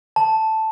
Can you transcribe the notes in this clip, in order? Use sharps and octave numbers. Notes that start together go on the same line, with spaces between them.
A5